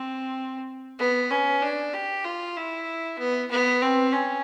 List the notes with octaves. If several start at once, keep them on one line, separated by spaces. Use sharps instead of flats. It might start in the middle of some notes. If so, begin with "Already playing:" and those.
Already playing: C4
B3
C#4
D4
G4
F4
E4
B3
B3
C4
C#4